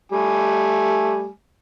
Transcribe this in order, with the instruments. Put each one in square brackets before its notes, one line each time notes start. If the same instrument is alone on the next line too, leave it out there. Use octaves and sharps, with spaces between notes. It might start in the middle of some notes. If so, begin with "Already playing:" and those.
[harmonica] G3 A3 G#5